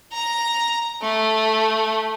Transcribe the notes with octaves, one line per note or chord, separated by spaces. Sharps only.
A#5
A3